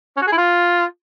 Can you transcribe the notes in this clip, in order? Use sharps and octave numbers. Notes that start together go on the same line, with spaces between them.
C#4
F#4
G#4
E4
F4